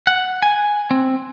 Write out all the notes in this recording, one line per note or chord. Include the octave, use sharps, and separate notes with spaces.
F#5
G#5
C4